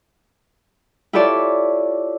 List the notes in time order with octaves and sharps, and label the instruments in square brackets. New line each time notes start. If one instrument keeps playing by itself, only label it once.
[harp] E4 F4 G4 A4 C#5 D5